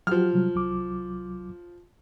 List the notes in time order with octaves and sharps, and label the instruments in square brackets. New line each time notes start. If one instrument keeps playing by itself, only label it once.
[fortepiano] F3 F6 [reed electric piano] F#3 F#4 G4
[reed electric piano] C3 F#3 G3
C2 F#3 D6